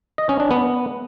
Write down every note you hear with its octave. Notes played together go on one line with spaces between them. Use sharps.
D#5
C#4
D4
B3